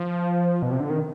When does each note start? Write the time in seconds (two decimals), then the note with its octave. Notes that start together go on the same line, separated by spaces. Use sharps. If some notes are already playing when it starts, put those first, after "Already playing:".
Already playing: F3
0.62 B2
0.72 C3
0.80 D3
0.90 D#3